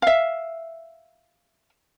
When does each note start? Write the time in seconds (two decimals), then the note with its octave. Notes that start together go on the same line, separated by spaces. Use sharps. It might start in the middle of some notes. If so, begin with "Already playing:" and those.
0.02 E5 F5